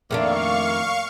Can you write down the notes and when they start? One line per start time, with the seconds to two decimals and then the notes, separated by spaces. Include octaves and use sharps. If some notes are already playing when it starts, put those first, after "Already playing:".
0.11 F2 D#3 A3 A#3 D4 F5 C#6